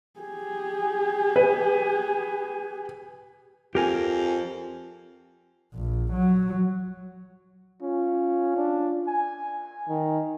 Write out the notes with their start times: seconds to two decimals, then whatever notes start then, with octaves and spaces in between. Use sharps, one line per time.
0.20 G4 G#4
1.36 B4
3.75 F2 G4 A#4 G#5
5.74 A#1
6.13 F#3
7.82 C#4 F4
8.57 D4
9.08 G#5
9.89 D#3